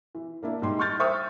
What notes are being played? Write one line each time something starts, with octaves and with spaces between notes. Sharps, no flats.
E3
A#3 D4 E4
G#2 G3 C6
C6 C#6 F6 G6 A6
C5 E5 G5 C#6 D#6 F6